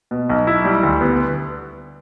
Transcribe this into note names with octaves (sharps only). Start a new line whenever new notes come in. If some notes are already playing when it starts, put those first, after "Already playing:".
B2
B1
E4
G3
D2
B3